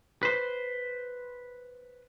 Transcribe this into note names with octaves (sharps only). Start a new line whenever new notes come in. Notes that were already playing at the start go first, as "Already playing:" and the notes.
B4 C5